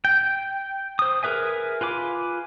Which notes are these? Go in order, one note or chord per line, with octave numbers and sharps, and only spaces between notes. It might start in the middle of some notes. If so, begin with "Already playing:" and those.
G5
C5 D#6
G#4 A#4 B4 E5 G#5
F4 B4 G#5 D6